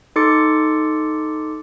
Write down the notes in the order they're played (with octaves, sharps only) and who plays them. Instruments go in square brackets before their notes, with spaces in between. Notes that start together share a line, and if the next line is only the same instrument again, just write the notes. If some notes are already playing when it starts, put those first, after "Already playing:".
[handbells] D#4 A4 C6 D6 A6 C#7